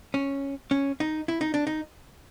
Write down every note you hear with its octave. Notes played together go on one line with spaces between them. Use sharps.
C#4
C#4
D#4
E4
D#4
D4
D#4